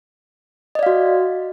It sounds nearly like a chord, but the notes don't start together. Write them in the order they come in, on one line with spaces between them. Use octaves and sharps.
D#5 D5 F5 F#4